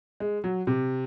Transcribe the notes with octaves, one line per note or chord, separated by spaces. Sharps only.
G#3
F#3
C3